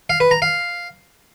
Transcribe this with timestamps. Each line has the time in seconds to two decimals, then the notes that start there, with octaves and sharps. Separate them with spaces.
0.10 F5
0.20 B4
0.31 A#5
0.42 F5